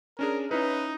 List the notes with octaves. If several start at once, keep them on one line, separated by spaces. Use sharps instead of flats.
C#4 D4 G#4 A#4
C#4 D#4 E4 B4